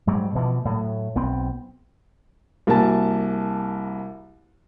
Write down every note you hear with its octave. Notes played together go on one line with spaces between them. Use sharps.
G#2 F#3 G3
B2 E3 F3
A2 F#3
B1 B3 C4
C2 A#3 F#4 G#5 A5 A6